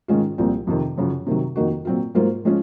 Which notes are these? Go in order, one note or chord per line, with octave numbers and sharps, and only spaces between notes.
G#2 D#3 G#3 C#4 F4
C2 A#2 F3 C4
F2 C3 D#3
F#2 C#3 F3
C3 D#3 F#3
F2 D#3 A#3 D#4 F#4
A#2 F#3 C4 F4
G#2 F#3 A#3 F4 C5
F3 G#3 C#4 F4